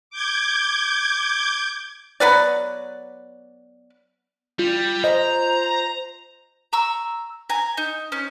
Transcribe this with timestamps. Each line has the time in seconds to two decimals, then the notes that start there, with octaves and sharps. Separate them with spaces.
0.10 D6 G6 G#6
2.20 F#3 B3 B4 D5
4.59 G3 F4
5.04 C5 D#5 A#5
6.73 A#5 C#6 E6
7.49 G#5 A#5
7.77 D#4
8.12 C#4